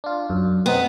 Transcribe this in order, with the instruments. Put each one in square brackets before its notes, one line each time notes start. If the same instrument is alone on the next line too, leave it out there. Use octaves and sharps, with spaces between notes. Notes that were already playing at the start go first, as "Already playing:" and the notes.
[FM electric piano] D4 F4
F#2
[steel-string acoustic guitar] B3 [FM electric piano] C4 D#4